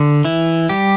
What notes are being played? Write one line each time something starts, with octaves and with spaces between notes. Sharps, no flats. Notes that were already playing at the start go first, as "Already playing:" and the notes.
Already playing: D3
E3 E4
G3 G4